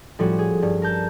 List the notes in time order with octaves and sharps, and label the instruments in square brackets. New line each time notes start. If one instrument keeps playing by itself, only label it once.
[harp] A2 F3 G3 C#4 F#4
G#4
G2
A#4 A5 G6